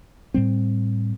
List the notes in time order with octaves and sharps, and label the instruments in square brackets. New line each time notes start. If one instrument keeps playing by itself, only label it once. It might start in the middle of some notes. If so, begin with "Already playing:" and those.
[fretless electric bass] A2 G3 C4